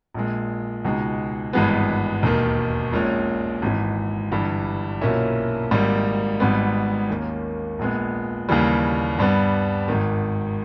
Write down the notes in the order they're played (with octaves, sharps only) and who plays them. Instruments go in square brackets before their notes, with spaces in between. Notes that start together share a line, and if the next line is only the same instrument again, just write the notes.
[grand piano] A#1 A#2 G#3
C#2 B2 G#3 D#4
G#1 G2 E3 G#3 B3
E1 D#2 D#3
A#1 A#2 G#3 C#4
G#1 G#2 E3
G1 G2 E3 G3
B1 A#2 A#3 C#4 E4
G#1 G#2 G3 A#3
G#1 G#2 G3 B3
D#2 D#3 A#3 C#4
A#1 A#2 G#3 B3
D#2 C#3 E3 G3
G2 G3 B3
G#1 G#2 D#3